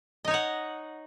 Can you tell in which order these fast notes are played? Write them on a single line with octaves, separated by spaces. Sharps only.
D#5 D#4 C#5 F#5